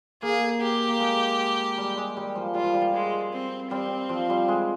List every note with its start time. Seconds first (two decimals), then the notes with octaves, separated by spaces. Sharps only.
0.22 A#3 G#4
0.62 G4
0.88 A#3
0.99 G#3
1.78 G3
1.97 G#3
2.17 G3
2.35 F3
2.54 G3 F4
2.64 F3
2.74 G3
2.94 G#3
3.32 C4
3.71 G3 C4
4.09 F3
4.30 G3
4.48 G#3